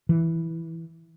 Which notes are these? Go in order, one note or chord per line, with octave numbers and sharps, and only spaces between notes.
E3